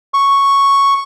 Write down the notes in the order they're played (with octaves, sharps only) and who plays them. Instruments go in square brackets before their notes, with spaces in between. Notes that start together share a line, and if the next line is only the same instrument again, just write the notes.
[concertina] C#6